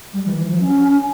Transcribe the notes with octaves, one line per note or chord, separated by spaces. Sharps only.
G3
E3
E3
F3
C#4